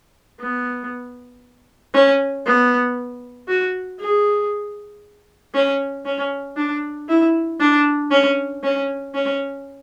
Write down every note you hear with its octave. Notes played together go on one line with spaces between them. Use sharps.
B3
C#4
B3
F#4
G#4
C#4
C#4
D4
E4
D4
C#4
C#4
C#4